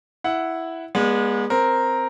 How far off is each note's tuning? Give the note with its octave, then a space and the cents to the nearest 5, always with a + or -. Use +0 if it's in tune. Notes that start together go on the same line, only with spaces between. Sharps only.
E4 +0 F#5 +0
G#3 -15 B3 -40 D5 +0
C4 +0 A#4 +0